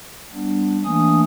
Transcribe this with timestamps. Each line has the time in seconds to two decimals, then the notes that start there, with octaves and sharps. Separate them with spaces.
0.33 G3 B3 D4
0.84 E3 A3 A#3 D4 G#5 D#6